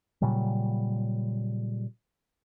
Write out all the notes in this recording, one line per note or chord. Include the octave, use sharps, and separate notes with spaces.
A#2 C#3 F#3 G3